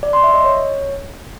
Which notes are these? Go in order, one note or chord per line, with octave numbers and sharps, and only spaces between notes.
D5
C6
E5
D#5
C#5